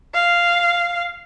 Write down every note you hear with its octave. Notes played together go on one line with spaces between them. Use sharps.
F5